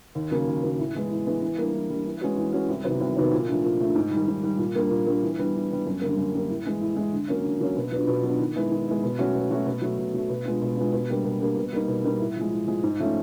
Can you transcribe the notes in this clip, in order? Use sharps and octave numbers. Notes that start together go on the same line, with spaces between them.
D#2
C#3 F#3 A#3
D#2
C#3 F#3 A#3
A2
E3 G#3 B3
A2
E3 G#3 B3
E3
G3 A#3 D4
E3
G3 A#3 D4
E3
G#3 C#4 F#4 B4
E3
G#3 C#4 F#4 B4
C2
C3 D#3 F#3 B3
C2
C3 D#3 F#3 B3
A#2
F3 A3 D4
A#2
F3 A3 D4
G#2
D#3 G3
G#2
D#3 G3
A#2
G3 A#3 D4
A#2
G3 A#3 D4
E3
G3 B3 D4
E3
G3 B3 D4
F#2
D3 G3 A#3
F#2
D3 G3 A#3
A2
E3 G#3
A2
E3 G#3
D3
F#3 A#3 C#4
D3
F#3 A#3 C#4
B2
F#3 B3 D4 F4
B2
F#3 B3 D4 F4
D#3
G#3 B3 E4
D#3
G#3 B3 E4
B2
F#3 A3 C#4 F#4
B2
F#3 A3 C#4 F#4
B2
F#3 A3
B2
F#3 A3
B2
G#3 B3 D4 F4
B2
G#3 B3 D4 F4
B2
G3 A#3 D4 G4
B2
G3 A#3 D4 G4
B2
G3 A#3 D#4
B2
G3 A#3 D#4
A2
F3 G#3
A2
F3 G#3
G#2
F3 A3 C#4 F4